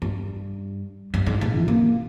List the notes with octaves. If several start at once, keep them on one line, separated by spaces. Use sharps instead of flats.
G2
G2
G#2
A#2
E3
A#3